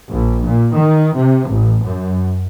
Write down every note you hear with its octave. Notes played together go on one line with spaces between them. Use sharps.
A#1
A#2
D#3
C3
A1
F#2